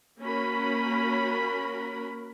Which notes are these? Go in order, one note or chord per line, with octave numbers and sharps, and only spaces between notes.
A#3 C#4 F#4 A#4 B5